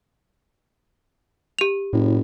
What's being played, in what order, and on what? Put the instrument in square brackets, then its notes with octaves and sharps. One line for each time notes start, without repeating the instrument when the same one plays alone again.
[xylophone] G4 F7
[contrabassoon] F#1 [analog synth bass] A2